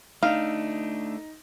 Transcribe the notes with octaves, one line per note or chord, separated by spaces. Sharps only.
A3 D4 D#4 F5